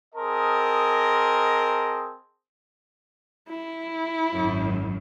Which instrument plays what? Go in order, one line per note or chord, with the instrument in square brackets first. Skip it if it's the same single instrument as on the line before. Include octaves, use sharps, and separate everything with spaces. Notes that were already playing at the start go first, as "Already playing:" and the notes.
[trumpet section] C4 G#4 A#4 D#5 A5 C6
[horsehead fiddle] E4
[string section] G#1 F#2